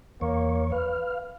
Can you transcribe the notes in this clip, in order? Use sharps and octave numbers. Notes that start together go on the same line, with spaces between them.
E2 A#3 C#5
B4 F5